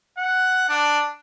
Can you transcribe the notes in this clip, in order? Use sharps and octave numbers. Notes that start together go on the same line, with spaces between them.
F#5
D4